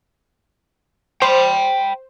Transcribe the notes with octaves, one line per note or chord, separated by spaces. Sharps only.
C5 G5 B5